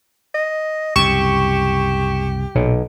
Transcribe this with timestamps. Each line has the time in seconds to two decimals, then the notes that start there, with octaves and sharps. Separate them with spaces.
0.35 D#5
0.96 C2 F#2 C#3 G4 C#6 E7
2.55 B1 A#2